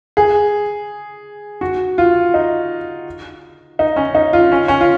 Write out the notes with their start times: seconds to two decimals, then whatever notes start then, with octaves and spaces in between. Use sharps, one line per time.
0.17 G#4
1.61 F#4
1.98 F4
2.34 D#4
3.79 D#4
3.96 C#4
4.15 D#4
4.33 F4
4.52 C#4
4.68 C#4
4.81 F4